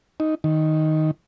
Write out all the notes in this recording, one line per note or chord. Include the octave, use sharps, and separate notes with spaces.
D#4
D#3